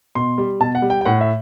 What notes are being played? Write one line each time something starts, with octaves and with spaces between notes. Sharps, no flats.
B2 C6
G3
B2 A5
F#5
G3
G5
G5
A2 F#5
E5